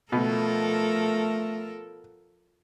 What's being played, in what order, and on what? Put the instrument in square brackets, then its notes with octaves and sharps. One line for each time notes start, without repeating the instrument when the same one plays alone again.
[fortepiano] B2 [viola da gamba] F3 A4 A#4 [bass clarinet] A3